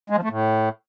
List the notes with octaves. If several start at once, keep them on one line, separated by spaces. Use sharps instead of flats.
G#3
F3
A3
A2